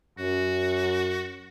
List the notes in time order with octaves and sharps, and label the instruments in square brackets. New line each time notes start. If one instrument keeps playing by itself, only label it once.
[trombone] F#2 [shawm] F#4